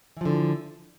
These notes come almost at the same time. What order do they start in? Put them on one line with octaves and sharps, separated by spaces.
E3 F3 D3